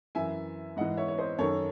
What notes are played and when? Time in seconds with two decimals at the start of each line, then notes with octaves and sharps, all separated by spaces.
0.15 F#2 E3 E5 G#5
0.76 G#2 E3 D#5 F#5
0.97 C#5 E5
1.08 C#5
1.18 C5 D#5
1.38 F#2 D#3 A4 C#5